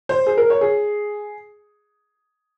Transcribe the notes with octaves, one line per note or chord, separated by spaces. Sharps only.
C5
G#4
A#4
C#5
G#4